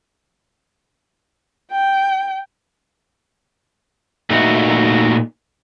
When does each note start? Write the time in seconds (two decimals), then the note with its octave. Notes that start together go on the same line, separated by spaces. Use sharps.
1.71 G5
4.30 A#2 A3 D#4 F#4